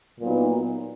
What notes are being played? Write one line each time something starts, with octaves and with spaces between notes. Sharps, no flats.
A#2 F#3 B3 D#4